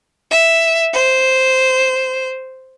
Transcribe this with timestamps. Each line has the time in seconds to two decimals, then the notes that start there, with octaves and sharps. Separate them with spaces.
0.31 E5
0.93 C5